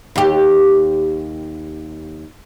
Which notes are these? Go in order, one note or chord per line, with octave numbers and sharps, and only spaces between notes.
D#2 G4